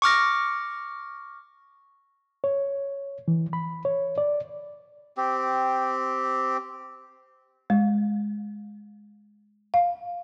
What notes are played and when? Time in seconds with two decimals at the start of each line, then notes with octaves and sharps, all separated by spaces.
0.02 C#6 D6 F6 A#6
2.44 C#5
3.28 E3
3.53 B5
3.85 C#5
4.18 D5
5.17 C4 G4
7.70 G#3
9.74 F5